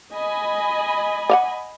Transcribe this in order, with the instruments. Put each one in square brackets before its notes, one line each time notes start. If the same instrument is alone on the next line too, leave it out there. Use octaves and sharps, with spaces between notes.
[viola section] D#5 G#5 B5
[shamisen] D5 F5 F#5